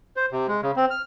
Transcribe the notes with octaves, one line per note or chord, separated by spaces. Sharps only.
C5
C3
G#3
C#3
C4
F6